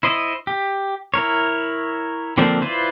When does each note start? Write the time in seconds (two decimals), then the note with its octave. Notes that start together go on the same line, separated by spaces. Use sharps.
0.03 E4 C5 D#5
0.47 G4
1.14 E4 A#4 C#5
2.38 D3 F3 A#3 C4 D4
2.61 E4 F4 B4 C5 D5